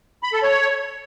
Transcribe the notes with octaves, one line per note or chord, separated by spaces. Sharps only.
B5
A4
C#5